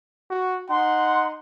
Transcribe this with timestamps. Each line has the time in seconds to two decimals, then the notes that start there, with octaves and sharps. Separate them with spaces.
0.30 F#4
0.70 D#4 F#5 C6